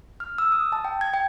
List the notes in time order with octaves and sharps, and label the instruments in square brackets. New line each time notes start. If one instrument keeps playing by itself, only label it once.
[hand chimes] F6
E6
D#6
A5
G5
G#6
G5